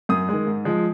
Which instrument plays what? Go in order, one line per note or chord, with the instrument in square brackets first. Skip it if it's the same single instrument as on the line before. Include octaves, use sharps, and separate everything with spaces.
[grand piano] F#2 D#6
D#3 G#3
G#2
F3 G#3